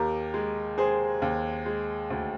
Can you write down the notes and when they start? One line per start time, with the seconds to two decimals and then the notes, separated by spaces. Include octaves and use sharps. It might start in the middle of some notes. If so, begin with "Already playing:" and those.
Already playing: D#2 G4 A#4
0.34 G#3
0.78 G#3 G#4 C5
1.22 D#2
1.66 G#3
2.10 D2